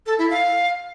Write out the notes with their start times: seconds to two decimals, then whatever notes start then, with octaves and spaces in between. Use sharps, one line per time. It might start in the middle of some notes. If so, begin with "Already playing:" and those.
0.06 A4
0.18 E4
0.30 F5